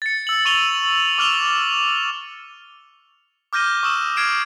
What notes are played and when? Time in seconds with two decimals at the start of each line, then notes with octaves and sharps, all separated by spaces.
0.02 A6 C#7
0.27 E6 F#7
0.45 C#6 D#7 F7 G7
1.18 D6 F6 F7 G7
3.53 D6 F6 G6 A#6 D#7 G7
3.83 C#6 D#6 E6 E7
4.16 F6 G#6 C7 D7 E7